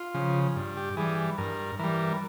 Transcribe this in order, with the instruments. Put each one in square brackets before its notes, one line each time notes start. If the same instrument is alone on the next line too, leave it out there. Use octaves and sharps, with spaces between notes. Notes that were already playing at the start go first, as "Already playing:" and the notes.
Already playing: [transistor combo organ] F4
C#3 F3
G2
G4
E3 G3 G#4
G2 A#4
E3 G3 A#4